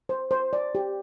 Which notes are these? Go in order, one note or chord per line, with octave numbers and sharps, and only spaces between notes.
C5
C5
D5
G4